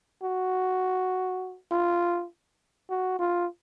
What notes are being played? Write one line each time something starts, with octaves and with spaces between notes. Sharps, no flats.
F#4
F4
F#4
F4